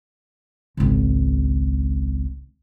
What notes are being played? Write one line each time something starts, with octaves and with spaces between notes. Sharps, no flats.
G#1 C#2